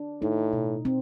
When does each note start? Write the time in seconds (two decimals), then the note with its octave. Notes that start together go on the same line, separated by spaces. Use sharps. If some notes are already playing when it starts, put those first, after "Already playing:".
Already playing: D4
0.22 A2 D#4
0.53 B2
0.85 C4